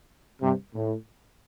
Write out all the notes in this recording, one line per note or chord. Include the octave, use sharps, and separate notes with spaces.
G2 C3
A2